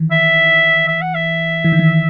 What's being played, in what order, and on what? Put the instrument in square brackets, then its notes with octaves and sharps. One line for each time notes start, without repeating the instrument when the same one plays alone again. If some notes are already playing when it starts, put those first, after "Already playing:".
Already playing: [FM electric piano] D#3 E3
[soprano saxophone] E5
E5
F#5
E5
[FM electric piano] E3
D#3
E3